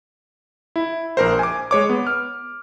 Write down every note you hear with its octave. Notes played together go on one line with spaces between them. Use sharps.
E4
A#1 A#4 C5
G#5 D6
G#3 C#5 D6
B3
F6